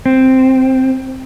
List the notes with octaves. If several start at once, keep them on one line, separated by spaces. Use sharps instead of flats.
C4